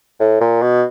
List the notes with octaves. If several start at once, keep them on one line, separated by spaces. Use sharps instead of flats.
A2
A#2
B2